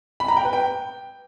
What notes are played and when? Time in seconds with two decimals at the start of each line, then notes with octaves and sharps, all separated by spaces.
0.20 B5
0.28 A#5
0.37 G5
0.45 B4
0.53 G5